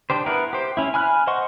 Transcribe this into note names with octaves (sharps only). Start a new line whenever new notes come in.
D4 G4 C5
B3 E4 A#4 B4
G4 C5
C#4 E4
G#5 B5 F6 F#6
C5 D#5 F#5 C6 C#6